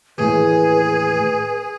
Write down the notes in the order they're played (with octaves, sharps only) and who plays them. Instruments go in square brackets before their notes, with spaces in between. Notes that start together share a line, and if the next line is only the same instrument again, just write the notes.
[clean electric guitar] D#2 A2 E3 [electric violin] G#4 [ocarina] B4